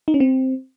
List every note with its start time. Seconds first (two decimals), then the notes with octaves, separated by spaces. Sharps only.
0.08 D#4
0.14 C#4
0.20 C4